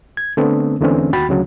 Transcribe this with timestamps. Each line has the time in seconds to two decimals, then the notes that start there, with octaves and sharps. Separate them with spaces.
0.17 G#6
0.37 D3 A3 B3 C4
0.81 E2 D3 E3 A3 C4 C#4
1.13 D#2 F#4 G5 B5 A6
1.29 D2 C#3 F#3